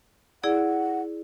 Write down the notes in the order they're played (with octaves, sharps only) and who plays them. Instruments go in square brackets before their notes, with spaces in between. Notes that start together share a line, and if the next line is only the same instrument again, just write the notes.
[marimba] E4 G#4 D5 [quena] F#5